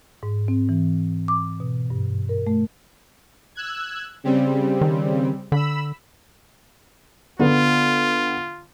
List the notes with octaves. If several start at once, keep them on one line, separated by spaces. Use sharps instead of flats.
G#2
C4
E3
D6
B2
G2
A#4
A3
E6 F#6 G#6
C#3 G3 C4
D#3
D3 B5 E6
D3 B3 F4